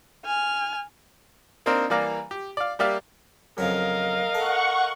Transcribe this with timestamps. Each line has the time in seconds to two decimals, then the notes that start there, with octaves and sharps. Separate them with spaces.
0.25 G#5 F6
1.66 A#3 C4 D4 D#4 A#4 C5
1.90 E3 G3 A#3 D5 F5 A#5
2.31 G4
2.57 D5 F5
2.79 G3 A#3 G4 D5 E5 F5
3.58 F2 C#3 F#3 A#4 D#5 F5
4.35 A4 F#5 C#6